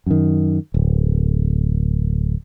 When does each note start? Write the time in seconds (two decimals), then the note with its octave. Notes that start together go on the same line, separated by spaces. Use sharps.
0.06 F#2 D#3
0.74 D1